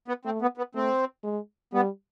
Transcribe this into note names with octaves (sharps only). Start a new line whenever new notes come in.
B3
A3 C4
B3
B3
A3 C4
G#3
G3 B3